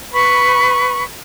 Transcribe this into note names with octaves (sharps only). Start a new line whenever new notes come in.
B4 B5 C#6